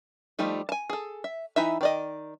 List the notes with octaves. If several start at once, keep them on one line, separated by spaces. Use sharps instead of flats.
F3 G3 A3 D#4
G#5 A5
G#4 A4
E5
E3 D#4 E4 E5
D#3 D5 D#5